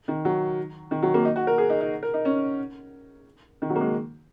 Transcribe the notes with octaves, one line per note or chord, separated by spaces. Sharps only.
D#3
F#3
D#3
F#3
A#3
D#4
F#4
A#4
G#4
D#4
D#4
A#4
D#4
C#4
D#3
F#3
A#3
G#3